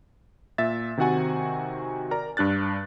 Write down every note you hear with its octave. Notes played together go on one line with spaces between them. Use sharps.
A#2 E5 A6
C3 D#3 C4 F#4 F#5 G#5
A#4 D5 A#5
G2 D4 F#6 A6